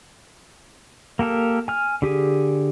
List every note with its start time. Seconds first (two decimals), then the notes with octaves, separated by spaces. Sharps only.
1.19 A#3 G4 A4 A#4
1.68 G#5 F6
2.02 D3 G4 G#4